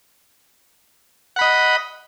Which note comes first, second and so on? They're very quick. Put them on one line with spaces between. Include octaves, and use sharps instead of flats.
F#5 B5 D#5